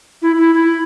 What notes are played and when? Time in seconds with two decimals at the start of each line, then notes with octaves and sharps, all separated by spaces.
0.22 E4
0.37 E4
0.54 E4